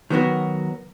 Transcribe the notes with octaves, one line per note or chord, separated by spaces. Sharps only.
D#3 F#3 B3 F#4 A#4